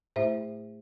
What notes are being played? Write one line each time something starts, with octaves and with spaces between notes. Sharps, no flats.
A2 A3 E4 C5 E5